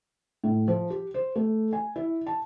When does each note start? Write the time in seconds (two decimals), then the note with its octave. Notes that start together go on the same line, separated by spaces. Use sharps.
0.44 A2
0.68 F3
0.90 G4
1.14 C5
1.36 A3
1.73 G#5
1.96 E4
2.27 A5